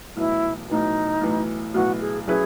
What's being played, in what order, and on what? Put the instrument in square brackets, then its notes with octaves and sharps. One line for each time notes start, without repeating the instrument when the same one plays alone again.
[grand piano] B1 A2 E3 [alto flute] E4
[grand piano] B1 A2 E3 [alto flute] D#4
[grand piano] B1 A2 E3
[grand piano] B1 A2 E3 [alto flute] F#4
[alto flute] G#4
[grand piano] F#3 C#4 E4 B4 [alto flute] G#4